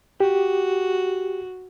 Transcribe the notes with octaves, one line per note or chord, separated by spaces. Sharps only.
F#4 G4